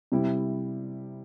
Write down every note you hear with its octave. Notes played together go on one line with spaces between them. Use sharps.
C3 G3 E4